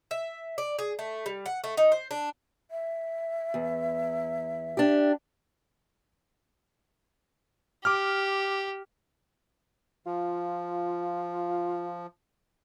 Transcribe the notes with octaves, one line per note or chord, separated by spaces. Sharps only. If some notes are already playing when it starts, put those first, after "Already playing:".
E5
D5
G#4
A3
G3
F#5
A3
D#4
C5
D4
E5
E2
D4 G4
G4 D6 F6
F3 F4